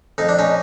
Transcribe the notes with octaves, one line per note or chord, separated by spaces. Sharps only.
F2 D#4
D4
C#4 D#4